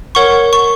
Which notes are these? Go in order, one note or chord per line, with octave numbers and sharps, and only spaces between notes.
A#4 C#5 F#5 C#6
C#6